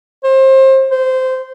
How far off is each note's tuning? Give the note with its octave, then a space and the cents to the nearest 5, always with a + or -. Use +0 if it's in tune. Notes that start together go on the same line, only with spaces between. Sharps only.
C5 +30
C5 -15